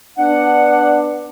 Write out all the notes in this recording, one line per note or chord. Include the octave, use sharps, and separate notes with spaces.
B3 D4 F#5